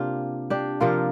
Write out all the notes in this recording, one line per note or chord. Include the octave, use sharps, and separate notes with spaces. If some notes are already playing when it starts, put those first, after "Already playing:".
Already playing: C3 A#3 D4 F4 G4
D4 G4
C3 F3 A#3 F4 A#4